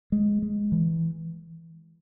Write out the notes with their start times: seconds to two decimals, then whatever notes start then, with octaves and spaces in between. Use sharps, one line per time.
0.12 G#3
0.42 G#3
0.72 E3